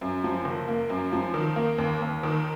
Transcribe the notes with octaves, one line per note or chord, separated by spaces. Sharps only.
F#2
F3
F#1
A#3
F#2
F3
D#3
A#3
D#2
D#2
D#3